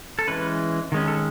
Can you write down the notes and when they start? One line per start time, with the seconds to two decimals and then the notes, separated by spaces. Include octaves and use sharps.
0.19 A4
0.27 E3 G#3 C#4 B4
0.92 D#3 G#3 C#4
1.08 A4